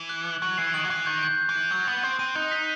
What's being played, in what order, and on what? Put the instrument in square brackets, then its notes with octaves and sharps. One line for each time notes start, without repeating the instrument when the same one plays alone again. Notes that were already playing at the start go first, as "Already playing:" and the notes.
Already playing: [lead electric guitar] E3
[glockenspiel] F#6
F#6
[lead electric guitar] F#3 [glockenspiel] F#6
[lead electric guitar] E3 [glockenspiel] C7
[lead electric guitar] D#3 [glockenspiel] F#7
[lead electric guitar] F#3
[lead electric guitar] E3 [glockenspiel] F#6
[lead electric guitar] D#3 [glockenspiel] G6
[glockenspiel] G6
G6
[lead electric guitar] E3
[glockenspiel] G6
[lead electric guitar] F#3 [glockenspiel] G6
[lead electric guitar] B3 [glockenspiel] G6
[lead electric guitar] C4 [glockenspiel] G6
[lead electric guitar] C4 [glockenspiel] D#7
[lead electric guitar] D#4 [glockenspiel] F#6
[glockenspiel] B6